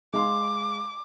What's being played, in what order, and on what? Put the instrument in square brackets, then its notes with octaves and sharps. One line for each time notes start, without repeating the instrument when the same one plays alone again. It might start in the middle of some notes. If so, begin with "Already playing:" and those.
[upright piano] G#3 F5 C6 [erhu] D6